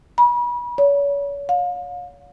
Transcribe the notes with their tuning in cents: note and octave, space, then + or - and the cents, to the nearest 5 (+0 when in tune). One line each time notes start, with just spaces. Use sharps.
B5 -35
C#5 +35
F5 +35